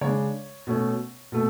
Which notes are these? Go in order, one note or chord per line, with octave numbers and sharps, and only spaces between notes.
C#3 G#3 D4 C#5
B2 A3 C#4
B2 A3